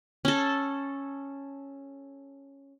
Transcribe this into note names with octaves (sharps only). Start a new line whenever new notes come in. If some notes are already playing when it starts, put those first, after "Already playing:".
C#4 A4